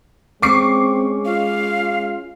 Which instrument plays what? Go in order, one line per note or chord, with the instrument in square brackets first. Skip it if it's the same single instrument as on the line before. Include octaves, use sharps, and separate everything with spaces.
[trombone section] G#3 C#4 [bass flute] C4 [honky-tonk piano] C#6 D6 C7
[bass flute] F4 [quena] F5